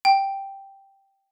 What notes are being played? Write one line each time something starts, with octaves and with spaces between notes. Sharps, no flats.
G5